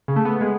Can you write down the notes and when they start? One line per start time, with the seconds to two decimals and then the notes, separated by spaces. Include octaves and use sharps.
0.08 C#3
0.16 A3
0.25 B3
0.41 G#3